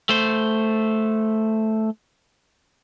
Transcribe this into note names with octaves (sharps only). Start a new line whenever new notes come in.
A3 C5